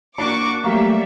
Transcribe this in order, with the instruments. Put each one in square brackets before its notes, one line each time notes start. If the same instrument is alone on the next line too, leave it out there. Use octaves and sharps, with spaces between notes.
[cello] A#3 F#4 [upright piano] D4 [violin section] C#6 D6
[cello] F#3 G3 [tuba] A3 [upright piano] A#3 G4 [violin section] E5